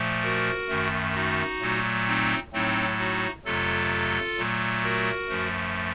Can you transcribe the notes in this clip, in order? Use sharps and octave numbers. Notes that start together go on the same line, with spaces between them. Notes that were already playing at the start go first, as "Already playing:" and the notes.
Already playing: A#2 F3 A3
F#4 A#4
F#2 D#3 A3
D#4 F#4
A#2 F#3 A3
C4 D#4
A2 F#3 A3 C4 D#4
D#4 F#4
F2 C3 F#3 A3 F4 A4
A#2 F#3 A3
F#4 A#4
F#2 F3 A3